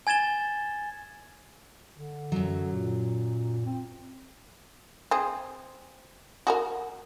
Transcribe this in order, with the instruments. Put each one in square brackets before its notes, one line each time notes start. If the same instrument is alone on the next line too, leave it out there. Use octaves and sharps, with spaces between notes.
[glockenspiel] G#5 G#6 A6 E7 G7
[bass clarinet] D3
[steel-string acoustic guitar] F#2 F#3
[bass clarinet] A#2
C4
[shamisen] C4 G#4
F#4 G#4 A#4